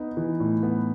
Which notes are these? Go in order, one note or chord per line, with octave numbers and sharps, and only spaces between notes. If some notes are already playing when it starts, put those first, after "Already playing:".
Already playing: B3 D#4
E3
A2
B3